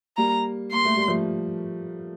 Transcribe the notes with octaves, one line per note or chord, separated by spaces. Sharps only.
G3 A#3 A#5
A#3 C6
A3
G3
F3 A3